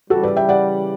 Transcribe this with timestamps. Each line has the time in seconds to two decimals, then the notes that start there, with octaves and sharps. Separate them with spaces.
0.09 C#3 E3 G3 F#4 A4
0.23 B4 D5
0.36 E5 G5
0.49 D5 F#5